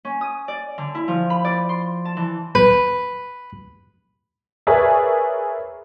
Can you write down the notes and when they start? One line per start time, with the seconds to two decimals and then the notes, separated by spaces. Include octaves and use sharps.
0.05 C#4
0.21 D#6
0.48 D5
0.78 D3
0.95 E4
1.08 F3
1.30 B5
1.45 D5
1.69 C6
2.05 A5
2.17 E3
2.55 B4
4.67 G#4 A#4 B4 C#5 D5 E5